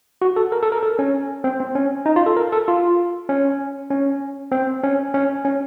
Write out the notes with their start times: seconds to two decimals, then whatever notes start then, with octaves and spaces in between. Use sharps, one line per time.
0.22 F#4
0.36 A4
0.52 A#4
0.63 A4
0.72 A#4
0.83 A4
0.99 C#4
1.44 C4
1.60 C4
1.75 C#4
2.06 D#4
2.16 F4
2.26 A4
2.37 A#4
2.52 A4
2.68 F4
3.29 C#4
3.90 C#4
4.52 C4
4.84 C#4
5.14 C#4
5.45 C#4